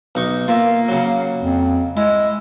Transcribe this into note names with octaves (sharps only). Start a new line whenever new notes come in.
B1 D#4 C#6
A#3 F4 A#4 E5
C#3 F#3
F2
G#3 E4